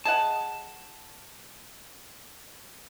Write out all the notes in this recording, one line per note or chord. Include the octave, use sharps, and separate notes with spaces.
G#4 D#5 F#5 A5